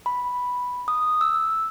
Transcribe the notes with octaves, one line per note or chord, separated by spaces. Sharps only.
B5
D#6
E6